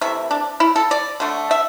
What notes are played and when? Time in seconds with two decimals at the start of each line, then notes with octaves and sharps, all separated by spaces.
0.01 C3 E3 A3 E5
0.31 D4
0.60 E4
0.76 A4
0.91 D5
1.20 D3 A3 D4
1.51 E5